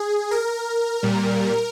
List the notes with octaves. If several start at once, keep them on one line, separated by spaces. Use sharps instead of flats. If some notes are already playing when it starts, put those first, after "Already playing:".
Already playing: G#4
A#4
A#2 G3